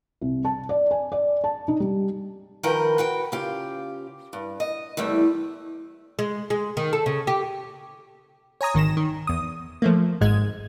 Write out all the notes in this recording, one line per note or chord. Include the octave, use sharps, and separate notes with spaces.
C2
A5
D5
G#5
D5
A5
D#4
G3
D#3 F3 A#4 B4 G5
F#4 B4 G5
C#3 F4 G4
G2
D#5
E2 C3 G3 A3
G#3
G#3
D#3
A4
C#3
G4
C#5 G#5 A#5 D#6
G#1 D#3 A#6 E7
D#3
E2 D#6
F3 A3 A#3
G#1 G#2 G#3 G#6